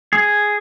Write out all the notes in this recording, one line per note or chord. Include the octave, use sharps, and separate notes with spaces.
G#4